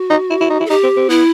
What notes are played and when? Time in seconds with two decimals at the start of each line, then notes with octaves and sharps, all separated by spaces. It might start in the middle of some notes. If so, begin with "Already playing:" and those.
Already playing: F#4
0.10 D#4
0.30 E4
0.40 E4
0.50 D#4
0.60 E4
0.66 A4
0.70 D#4 G4
0.83 C4
0.97 C4
1.09 B3 E4